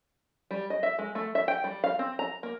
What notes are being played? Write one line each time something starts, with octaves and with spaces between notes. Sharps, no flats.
G3
D#5
E5
G#3
A3
E5
G5
G3
F5
C4
A#5
A#3